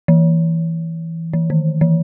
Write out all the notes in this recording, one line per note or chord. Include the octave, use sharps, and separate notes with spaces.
E3
E3
D#3
E3